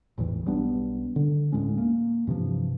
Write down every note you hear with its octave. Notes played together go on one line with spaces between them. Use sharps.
G#1 E2 A2 E3
B1 G3 B3 D4
D3
D2 A2 G#3 C#4
A#3
G2 C3 E3 F3